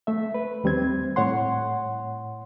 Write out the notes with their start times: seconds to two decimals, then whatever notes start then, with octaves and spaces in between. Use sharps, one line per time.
0.07 A3 E5
0.34 B4
0.64 D#2 G3 C4 G#6
1.16 A2 C#5 F#5 C6